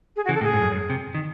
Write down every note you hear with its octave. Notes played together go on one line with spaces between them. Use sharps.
G#4
F#4
C#3 E3
A4
A2
G#4
G#2
F#2
F#2
C3
D#3